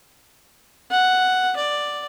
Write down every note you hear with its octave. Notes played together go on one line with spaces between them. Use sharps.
F#5
D5